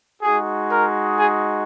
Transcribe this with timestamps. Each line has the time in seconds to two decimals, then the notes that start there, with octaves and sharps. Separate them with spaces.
0.22 G#3 D#4 F#4 G#4
0.69 A#4
1.16 G#4